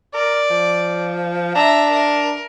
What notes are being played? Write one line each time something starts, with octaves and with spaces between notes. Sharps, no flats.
A#4 D5
F3
D4 E5 A#5
A#4